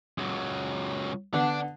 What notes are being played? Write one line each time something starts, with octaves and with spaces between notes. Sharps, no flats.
C#2 F#3
D3 B3 D4